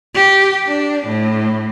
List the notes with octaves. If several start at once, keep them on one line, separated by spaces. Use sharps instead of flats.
G4
D4
A2